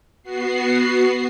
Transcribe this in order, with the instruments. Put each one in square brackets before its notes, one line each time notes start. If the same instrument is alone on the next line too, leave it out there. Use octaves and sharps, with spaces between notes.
[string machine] B3 F#4 C7